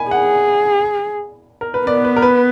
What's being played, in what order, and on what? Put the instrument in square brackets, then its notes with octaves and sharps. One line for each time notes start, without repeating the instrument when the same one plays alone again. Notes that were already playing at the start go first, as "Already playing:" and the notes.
Already playing: [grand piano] G#5 B5
[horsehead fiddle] G#4 [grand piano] F#5
[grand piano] A#4
B4
[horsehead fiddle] B3 [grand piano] D5
[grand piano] B4
A#4
B4